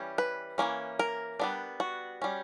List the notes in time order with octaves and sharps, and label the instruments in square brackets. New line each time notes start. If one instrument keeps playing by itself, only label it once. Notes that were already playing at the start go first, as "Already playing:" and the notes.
Already playing: [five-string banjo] E3 G3 C#4
B4
E3 G3 A#3 C#4
A#4
G3 B3 D4
F#4
G3 C#4